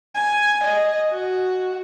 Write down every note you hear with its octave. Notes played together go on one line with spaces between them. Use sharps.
G#5
D#5
F#4